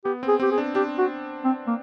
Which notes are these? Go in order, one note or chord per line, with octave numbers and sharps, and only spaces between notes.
B3 G4
C4
G#4
C4 G4
G#4
D4
D4 G4
F#4
C4
A#3